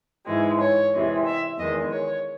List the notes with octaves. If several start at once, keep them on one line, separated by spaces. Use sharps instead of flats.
G#2 E3 G#3
C#5
E2 C3 E3 G#3
E5
E2 D#3 G#3 D#5
C#5